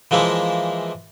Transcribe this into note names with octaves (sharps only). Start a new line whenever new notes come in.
E3 F3 G#3 A#3 E4